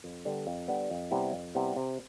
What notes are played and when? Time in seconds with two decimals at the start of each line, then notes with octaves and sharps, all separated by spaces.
0.04 F2
0.25 D3 G3 B3 D4
0.47 F2
0.68 D3 G3 B3 D4
0.90 F2
1.11 C3 G3 B3 E4
1.33 F2
1.55 C3 G3 B3 E4
1.76 C3